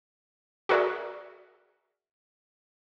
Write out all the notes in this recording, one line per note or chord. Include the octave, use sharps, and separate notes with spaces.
F#4 G#4 A#4 D5 E5